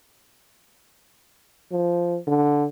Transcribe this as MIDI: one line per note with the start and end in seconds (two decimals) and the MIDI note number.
1.72 2.19 53
2.28 2.66 50